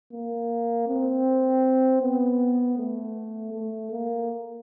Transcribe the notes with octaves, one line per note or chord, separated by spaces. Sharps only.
A#3
C4
B3
A3
A3
A#3